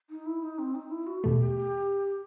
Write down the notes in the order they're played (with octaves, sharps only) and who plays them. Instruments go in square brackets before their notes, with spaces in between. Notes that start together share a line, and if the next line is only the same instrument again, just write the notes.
[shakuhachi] D#4
E4
D#4
C4
D#4
E4
F#4
[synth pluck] E2 B2 A3 [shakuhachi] G4
[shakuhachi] G4
G4